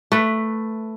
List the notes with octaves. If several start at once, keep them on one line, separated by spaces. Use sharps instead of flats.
A3 B4